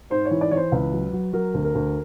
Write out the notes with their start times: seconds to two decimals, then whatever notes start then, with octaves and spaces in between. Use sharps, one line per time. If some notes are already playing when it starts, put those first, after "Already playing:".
0.10 G#2 C5
0.25 C#5
0.31 E3
0.41 D5
0.51 E3 C#5
0.57 C5
0.72 C#2 B4
0.93 F#3
1.13 F#3
1.33 F#3 A#4
1.54 D2
1.65 A#4
1.75 D2